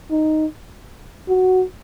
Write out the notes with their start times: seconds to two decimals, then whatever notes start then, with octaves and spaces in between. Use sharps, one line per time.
0.11 D#4
1.29 F#4